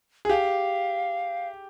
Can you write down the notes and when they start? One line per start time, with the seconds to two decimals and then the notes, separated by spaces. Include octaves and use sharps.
0.25 G#4
0.29 G4 F5